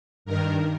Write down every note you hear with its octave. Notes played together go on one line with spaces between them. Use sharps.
G2 D#3 A#4